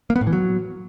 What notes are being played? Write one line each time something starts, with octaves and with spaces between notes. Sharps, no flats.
A#3
B3
A2
E3
F#3